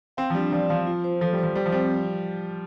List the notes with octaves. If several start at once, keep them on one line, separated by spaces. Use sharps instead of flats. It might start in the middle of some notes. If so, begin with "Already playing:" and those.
C4 F5
F3
G3 D4
F3 D5
F3 F5
F4
C5
F3 A4
G3
F3 C5
G3 C5
F3
G3 C4